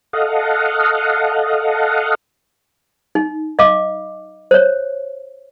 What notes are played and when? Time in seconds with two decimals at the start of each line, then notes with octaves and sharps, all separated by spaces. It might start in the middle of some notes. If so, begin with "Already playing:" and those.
0.13 A4 D#5 F5 F#5
3.15 D#4
3.59 D#5 F5 D6
4.51 C5 C#5